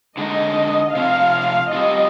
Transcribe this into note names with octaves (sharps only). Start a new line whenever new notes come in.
D3 G#3 D#4 D#5
C3 F3 C4 F5
G3 C4 F4 D#5